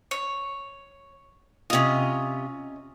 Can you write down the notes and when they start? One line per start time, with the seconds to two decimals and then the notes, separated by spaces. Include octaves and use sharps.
0.11 C#5
1.70 C3 C#4 F4 D#5